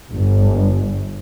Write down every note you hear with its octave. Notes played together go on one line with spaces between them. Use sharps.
G1